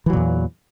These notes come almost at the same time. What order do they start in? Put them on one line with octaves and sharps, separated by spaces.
E3 F#3 A#2 E2